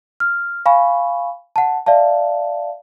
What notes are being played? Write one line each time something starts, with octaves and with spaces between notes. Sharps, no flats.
F6
F5 G#5 B5 C#6
F#5 A5
D5 E5 F5 A5